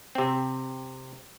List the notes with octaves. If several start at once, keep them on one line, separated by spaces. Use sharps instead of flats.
C3 C4